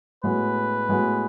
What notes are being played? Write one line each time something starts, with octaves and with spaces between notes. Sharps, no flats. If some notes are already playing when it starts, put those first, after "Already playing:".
A2 G#3 B3 F#4 B4
A2 G#3 B3 F#4